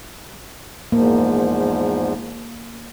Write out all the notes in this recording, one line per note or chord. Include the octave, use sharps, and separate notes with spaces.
E2 G#2 F3 A#3